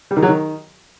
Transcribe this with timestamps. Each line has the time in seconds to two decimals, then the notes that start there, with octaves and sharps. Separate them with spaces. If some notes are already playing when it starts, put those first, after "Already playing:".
0.11 G3
0.17 D#3
0.23 F#3
0.28 D#3